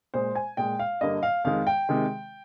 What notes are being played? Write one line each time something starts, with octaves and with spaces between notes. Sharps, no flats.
A#2 G#3 C5
G#5
A#2 G#3 G5
F5
G2 D3 G3 A#3 D#5
F5
F2 D#3 G#3 F5
G5
C3 D#3 G#3